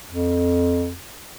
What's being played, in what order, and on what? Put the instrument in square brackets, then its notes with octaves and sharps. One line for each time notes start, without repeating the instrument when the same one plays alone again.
[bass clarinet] F2